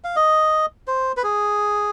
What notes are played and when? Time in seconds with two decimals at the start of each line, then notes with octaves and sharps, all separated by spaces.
0.04 F5
0.16 D#5
0.87 C5
1.17 B4
1.24 G#4